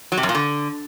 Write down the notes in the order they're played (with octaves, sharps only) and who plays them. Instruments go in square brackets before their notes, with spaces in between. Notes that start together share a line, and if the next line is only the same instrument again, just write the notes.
[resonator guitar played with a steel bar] F#3
C3
F#2
A#2
D3